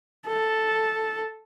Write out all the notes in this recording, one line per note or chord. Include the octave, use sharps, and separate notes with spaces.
A4